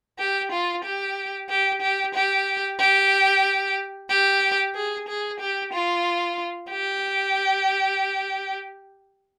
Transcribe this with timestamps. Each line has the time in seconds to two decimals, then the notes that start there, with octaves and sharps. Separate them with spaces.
0.19 G4
0.52 F4
0.85 G4
1.50 G4
1.82 G4
2.15 G4
2.80 G4
4.10 G4
4.75 G#4
5.09 G#4
5.40 G4
5.73 F4
6.71 G4